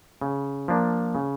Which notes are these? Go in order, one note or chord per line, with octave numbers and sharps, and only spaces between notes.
C#3
F3 A#3 D4
C#3